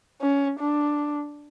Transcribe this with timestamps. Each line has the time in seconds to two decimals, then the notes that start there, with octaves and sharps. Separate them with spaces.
0.21 C#4
0.59 D4